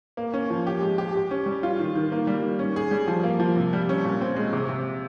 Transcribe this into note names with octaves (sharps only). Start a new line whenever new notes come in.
A#3
C#4
F3
G4
G#3
G4
G4
C#4
G3
F4
D#3
D#3
A#3
G3
D#3
C#4
G#4
G3
F3
A#3
F3
C3
G3
C#4
A#2
C4
G#3
C3
C3